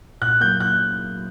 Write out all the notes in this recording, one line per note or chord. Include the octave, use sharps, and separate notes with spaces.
A#2 F#6
F#3 A#3 G6
A#2 F#6